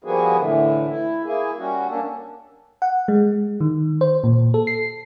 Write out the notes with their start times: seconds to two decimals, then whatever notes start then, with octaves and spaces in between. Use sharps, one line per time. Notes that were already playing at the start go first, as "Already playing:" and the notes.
0.04 F3 G3 A#3 B3 F#4 G#4
0.38 A2 D3 E3
0.89 E4
1.24 A#3 E4 G#4
1.58 G3 C#4 F#4
1.89 A#3 C#4 D4 A4
2.82 F#5
3.08 G#3
3.60 D#3
4.01 C5
4.24 A#2
4.54 A4
4.67 C7